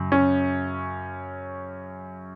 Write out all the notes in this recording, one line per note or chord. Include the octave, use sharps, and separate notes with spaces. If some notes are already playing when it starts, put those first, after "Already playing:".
Already playing: F#2 C#3
C#4